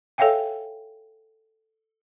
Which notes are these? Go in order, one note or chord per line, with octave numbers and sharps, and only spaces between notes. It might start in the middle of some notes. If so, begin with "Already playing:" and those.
A4 C#5 E5 F5 G5 G#5